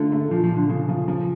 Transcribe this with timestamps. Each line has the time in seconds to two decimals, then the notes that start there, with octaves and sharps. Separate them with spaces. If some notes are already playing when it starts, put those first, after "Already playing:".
Already playing: D3 A3 F4
0.12 A3
0.31 A#2 F3
0.44 F3
0.50 A#2
0.57 D3
0.69 C#3 F3
0.88 F3
1.08 F3